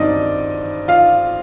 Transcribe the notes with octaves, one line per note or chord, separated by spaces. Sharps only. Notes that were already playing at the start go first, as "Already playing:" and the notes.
Already playing: G2 D#3 F#3 C4 D4 D#4 D5 D#5
F4 F5